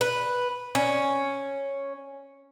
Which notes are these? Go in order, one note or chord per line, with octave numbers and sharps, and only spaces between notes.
B4
C#4